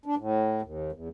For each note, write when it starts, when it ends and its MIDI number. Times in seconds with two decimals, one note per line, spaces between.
0.06 0.15 62
0.18 0.62 45
0.62 0.91 39
0.92 1.09 40